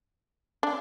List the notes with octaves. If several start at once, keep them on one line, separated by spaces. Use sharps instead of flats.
D4